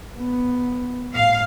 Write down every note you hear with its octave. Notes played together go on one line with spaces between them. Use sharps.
B3
A2 F5